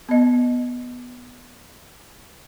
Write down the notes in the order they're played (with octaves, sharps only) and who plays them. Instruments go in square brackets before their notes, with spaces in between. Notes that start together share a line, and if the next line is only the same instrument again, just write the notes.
[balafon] B3 D#5